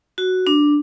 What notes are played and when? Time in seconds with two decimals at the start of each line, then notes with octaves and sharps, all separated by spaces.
0.18 F#4
0.47 D4